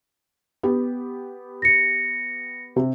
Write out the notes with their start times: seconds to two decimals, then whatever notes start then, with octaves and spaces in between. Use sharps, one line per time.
0.63 B3 G4
1.62 A#6 C#7
2.76 C3